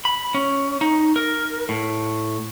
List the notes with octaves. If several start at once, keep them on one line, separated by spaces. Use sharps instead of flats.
B5
C#4
D#4
A#4
A2